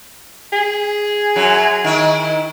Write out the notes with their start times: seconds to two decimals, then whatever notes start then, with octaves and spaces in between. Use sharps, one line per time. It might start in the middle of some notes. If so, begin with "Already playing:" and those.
0.52 G#4
1.36 F#2 F#3
1.84 D#3 E4